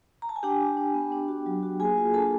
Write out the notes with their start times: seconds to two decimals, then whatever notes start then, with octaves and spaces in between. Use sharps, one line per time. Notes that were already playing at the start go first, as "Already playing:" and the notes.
0.22 A#5
0.29 A5
0.36 G#5
0.43 D4 G4 G5
0.61 D4
0.77 D4
0.94 B3
1.12 D4
1.28 F#4
1.46 F#3
1.63 F#4
1.80 A#3 G#4 G#5
1.97 F4
2.14 D4 A4 A5